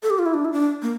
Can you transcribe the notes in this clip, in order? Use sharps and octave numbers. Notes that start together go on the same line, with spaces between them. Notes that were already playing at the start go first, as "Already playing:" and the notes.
A4
G4
F4
E4
D4
E4
D4
A#3